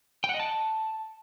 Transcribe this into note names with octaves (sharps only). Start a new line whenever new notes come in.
G5
F#5
D#5
A5